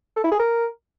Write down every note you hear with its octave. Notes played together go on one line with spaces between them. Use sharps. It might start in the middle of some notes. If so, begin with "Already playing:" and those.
A4
E4
G#4
A#4